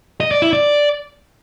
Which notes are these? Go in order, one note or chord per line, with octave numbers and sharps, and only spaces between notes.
D#5
D5
E4
D5